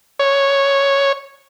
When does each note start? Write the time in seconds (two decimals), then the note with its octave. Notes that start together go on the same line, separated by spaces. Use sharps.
0.19 C#5